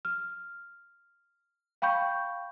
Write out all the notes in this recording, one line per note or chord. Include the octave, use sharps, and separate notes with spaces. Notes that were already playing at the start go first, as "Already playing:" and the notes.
F6
F5 G5 B5 C#6 G6